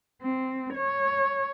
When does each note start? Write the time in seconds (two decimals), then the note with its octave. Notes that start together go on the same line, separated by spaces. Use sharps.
0.22 C4
0.74 C#5